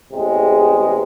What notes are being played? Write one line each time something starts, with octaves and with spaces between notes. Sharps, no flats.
A1 E2 C3 G#3